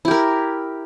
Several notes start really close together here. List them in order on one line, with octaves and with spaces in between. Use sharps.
E4 G4 A#4